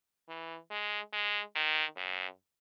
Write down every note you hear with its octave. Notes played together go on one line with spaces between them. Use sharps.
E3
G#3
G#3
D#3
F#2